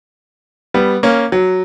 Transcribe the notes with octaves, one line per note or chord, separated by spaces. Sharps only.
G3 B3
A#3 C#4
F#3